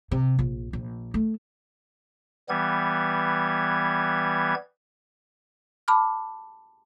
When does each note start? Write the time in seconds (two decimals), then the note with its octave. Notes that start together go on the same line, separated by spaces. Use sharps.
0.12 C3
0.39 A#1
0.73 A#1
1.14 A3
2.49 E3 G3 B3 G#6
5.88 A5 B5 D6 F6